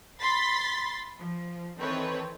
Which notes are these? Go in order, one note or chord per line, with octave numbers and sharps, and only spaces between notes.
B5 C6 A6 B6 C7
F3
D#3 E3 C4 A4 B4 C#5